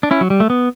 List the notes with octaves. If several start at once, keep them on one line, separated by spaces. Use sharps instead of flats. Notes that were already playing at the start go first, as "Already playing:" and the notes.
D4
C#4 E4
F#3
G3
A3
B3